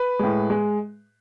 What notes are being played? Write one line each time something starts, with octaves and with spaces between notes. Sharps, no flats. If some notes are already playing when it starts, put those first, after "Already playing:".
Already playing: B4
A2 G#3
G#3